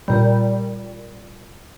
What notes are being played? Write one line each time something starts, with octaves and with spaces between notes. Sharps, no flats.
A#2 G3